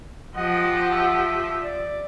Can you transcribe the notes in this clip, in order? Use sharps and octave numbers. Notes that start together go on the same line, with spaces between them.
F3 G4 D#5 F#5
E5
D5